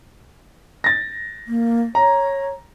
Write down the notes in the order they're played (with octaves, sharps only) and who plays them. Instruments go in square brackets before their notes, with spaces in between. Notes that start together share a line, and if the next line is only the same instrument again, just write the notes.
[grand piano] A6 A#6
[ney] A#3
[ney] C#5 [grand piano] A#5